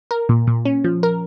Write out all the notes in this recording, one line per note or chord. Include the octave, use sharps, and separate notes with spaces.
A#4
A#2
A#2
C#4
F3
A#4